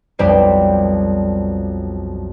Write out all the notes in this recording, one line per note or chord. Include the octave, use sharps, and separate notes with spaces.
B1 F2 F#3 G3 C5 D7